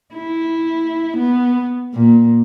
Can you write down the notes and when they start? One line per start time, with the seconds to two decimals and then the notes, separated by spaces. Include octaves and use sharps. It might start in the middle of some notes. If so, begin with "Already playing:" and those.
0.14 E4
1.17 B3
1.94 A#2